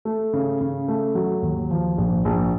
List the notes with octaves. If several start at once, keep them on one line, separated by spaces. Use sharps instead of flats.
A3
C#3
C#3
A3
F#3
D#2
F3
A#1
A#1